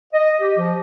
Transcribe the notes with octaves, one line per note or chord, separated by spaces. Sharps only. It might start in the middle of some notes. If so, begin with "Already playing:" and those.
D#5
G4
F3